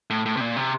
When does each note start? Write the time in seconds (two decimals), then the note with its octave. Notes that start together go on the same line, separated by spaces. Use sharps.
0.10 A2
0.26 A2
0.37 C3
0.41 A#2
0.56 C3